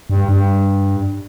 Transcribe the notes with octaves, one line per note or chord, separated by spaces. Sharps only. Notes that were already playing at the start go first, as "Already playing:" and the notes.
G2
G2